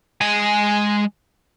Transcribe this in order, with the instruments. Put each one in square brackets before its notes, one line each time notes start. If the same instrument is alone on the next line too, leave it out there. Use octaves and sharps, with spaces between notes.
[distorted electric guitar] G#3 G#5